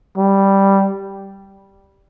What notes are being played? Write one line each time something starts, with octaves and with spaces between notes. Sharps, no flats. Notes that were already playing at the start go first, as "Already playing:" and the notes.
G3